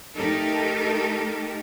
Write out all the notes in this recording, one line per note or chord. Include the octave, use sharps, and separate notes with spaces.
A3 D#4 G4 A4 A#4